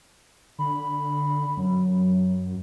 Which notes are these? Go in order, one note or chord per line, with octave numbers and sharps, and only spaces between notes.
D3 B5
F#2 F#3